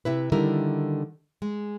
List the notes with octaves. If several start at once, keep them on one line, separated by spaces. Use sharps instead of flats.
C3 E4 B4
D3 D#3 G3 E4 A#4
G#3